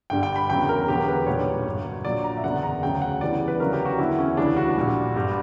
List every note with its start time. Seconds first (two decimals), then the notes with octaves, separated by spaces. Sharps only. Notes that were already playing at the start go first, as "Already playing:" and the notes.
0.10 G1 G2 D3 G3 G5
0.23 G5
0.36 B5
0.50 E2 C#3 F#3 G5
0.69 A#4
0.88 E1 E2 D3 F#3 G4
1.08 B4
1.26 B1 A#2 G3 C#5
1.66 G1 G2 F#3
2.05 A#1 A#2 F#3 D5
2.24 A#5
2.37 E5
2.43 F#1 E2 D3 F#5
2.63 A#5
2.83 D2 C#3 F#3 G5
3.02 F#5
3.21 E2 C#3 E3 G3 D5
3.48 B4
3.60 D2 C#3 F#3 A#4
3.73 G4
3.85 F#4
3.99 E2 D3 F#3 E4
4.19 C#4
4.37 D2 C#3 E3 G3 D4
4.57 F#4
4.77 A#1 A#2 G3
5.15 G1 G2 D3 G3